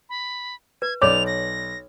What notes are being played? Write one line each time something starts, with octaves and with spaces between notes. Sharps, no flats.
B5
B4 G#6
B1 C#5 D5 D6 F7
A#6